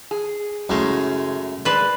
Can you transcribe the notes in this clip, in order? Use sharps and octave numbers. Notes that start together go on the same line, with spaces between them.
G#4
F#2 A2 C#3 G#3 A3
G#3 B4 D5 A5